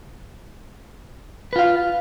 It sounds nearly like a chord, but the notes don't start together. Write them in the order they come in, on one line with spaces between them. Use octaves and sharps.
B4 F4 F5